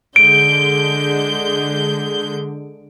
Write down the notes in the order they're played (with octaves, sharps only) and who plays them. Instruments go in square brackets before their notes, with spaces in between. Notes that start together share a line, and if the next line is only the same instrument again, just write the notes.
[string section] D3 G#3 G6 [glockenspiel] D7